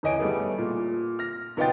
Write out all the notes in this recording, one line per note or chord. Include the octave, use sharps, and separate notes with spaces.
D#1 E3 C#5 D#5 G#5 D7
G3 A3 B3 G#4
A#2
F6 A#6
B1 B3 F4 D#5 G5 A6